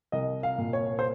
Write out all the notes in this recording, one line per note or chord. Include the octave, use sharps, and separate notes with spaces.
C2 D#5
F5
A#2
C#5
C5